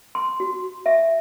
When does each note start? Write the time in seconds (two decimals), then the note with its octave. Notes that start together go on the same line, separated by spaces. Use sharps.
0.15 C6
0.40 F#4
0.86 E5